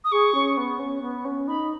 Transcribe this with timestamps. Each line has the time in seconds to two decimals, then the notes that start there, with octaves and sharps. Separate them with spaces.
0.05 D#6
0.12 G#4 C#6
0.35 C#4
0.57 B3
0.79 C#4
1.02 B3
1.25 C#4
1.48 D#4 B5